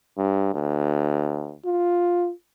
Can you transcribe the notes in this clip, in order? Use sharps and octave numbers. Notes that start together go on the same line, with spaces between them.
G2
D2
F4